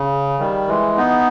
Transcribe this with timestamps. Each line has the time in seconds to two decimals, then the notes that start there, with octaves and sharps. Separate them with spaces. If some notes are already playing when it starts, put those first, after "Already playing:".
Already playing: C#3
0.39 D#3 G3
0.68 E3 G#3
0.97 B3 D#4